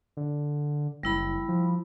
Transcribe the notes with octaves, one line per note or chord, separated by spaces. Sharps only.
D3
F#1 G3 E4 B5
F3